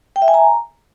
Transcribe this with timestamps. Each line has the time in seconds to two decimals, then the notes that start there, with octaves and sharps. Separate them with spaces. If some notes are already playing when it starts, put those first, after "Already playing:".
0.16 G5
0.22 E5
0.28 G#5
0.34 A#5